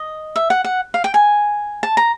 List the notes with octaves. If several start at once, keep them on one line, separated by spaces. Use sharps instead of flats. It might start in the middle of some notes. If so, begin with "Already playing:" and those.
Already playing: D#5
E5
F#5
F#5
F5
G5
G#5
A5
A#5